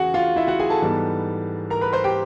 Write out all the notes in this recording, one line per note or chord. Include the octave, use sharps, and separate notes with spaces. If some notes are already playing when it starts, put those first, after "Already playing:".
Already playing: E2 C#3 F#4 G#4 F#5
F4 F5
E4 E5
F#4 F#5
G#4 G#5
A4 A5
G#2 E3 G3 B3
A#4 A#5
B4 B5
C5 C6
G4 G5